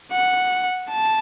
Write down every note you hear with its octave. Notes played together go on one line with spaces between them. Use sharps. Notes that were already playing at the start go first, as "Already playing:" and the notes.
F#5
A5